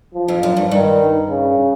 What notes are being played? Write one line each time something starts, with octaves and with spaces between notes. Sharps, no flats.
F3
F2
F#2
G2
G2 D#3
C#3